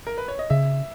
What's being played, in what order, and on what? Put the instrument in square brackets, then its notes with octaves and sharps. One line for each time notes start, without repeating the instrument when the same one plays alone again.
[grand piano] A#4
B4
C#5
D#5
[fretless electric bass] C#3 [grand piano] E5